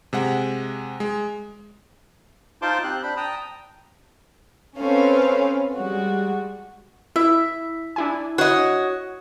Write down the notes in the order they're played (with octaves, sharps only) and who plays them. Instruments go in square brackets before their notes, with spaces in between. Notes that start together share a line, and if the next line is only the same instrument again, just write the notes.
[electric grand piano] C3 G#3 F#5
G#3
[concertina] D#4 F4 C5 A5 C6 D6
C4 G4 F#6
D4 C5 B5
G5 A5 A#5 D#6
[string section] C4 C#4 A4 B4 C5 F5
G3 G#3 F#4
[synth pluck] E4 [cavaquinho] E5
[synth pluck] D4 E4 G#5
[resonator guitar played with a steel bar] F#4 D#5 [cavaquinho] C#5